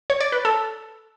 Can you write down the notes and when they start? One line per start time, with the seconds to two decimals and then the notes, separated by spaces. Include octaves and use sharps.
0.10 C#5
0.21 D5
0.32 B4
0.45 A4